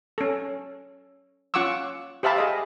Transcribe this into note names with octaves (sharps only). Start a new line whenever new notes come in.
C#4 A4
C#4 F4 F#5 C#6 D6 E6
G4 C5 E5 F5 A5 B5
G#4 D#5 E5